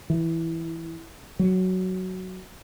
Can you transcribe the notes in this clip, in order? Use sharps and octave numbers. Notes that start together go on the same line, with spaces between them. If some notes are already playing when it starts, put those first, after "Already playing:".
E3
F#3